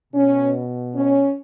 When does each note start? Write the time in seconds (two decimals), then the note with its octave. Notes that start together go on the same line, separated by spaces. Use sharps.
0.13 B2 C#4
0.95 C#4